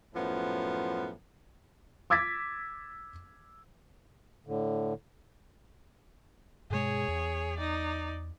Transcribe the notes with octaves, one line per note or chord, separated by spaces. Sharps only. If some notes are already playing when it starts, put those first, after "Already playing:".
F#2 A2 F3 B3
D6 E6 G#6 A6 B6
A2 D3
G2 B2 G#3 G#4 C#5
E2
D#4 D5